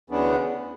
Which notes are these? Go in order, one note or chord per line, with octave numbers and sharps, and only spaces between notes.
D2 C#3 E3 B3 D4